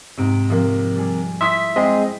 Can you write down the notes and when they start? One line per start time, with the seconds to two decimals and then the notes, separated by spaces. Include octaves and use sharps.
0.18 G#2 C3 D7
0.50 C3 F3 A#3
0.96 G3 G#4
1.41 E4 E5 C6 D#6 B6
1.76 G#3 C4 G#4 D#5